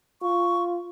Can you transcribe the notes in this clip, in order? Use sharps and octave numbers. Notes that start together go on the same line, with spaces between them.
F4 C#6